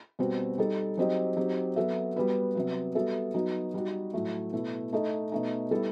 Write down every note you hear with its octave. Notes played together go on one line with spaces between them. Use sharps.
B2 G3 C4 F#4
G3 D#4 A4
F#3 C4 D#4 G4 D#5
F#3 C4 D#4 G4
F#3 B3 F#4 A4 E5
G3 B3 F#4 B4
C3 F#3 B3
G3 B3 F#4 A4 E5
F#3 B3 D#4 F#4
G3 D#4 F#4
A2 F#3 A3
B2 A3 E4
A3 D#4 A4 D#5
B2 A3 D#4
G3 B3 E4 A4